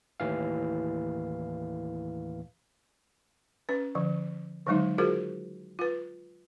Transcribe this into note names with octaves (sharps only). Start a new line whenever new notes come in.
D#2 A2 E3 F5
C#4 B4
D3 F3
D3 D#3 F#3 G#3 D#4
F4 F#4 G#4 A#4 C5
F4 B4